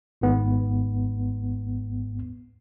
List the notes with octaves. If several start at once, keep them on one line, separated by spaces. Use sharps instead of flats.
G#1 G#2 B3